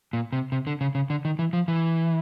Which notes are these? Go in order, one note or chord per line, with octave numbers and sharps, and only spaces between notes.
A#2
C3
C3
D3
C#3
C#3
D3
D#3
E3
F3
E3